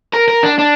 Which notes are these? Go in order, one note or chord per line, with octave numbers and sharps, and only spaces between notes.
A#4
A#4
D4
D4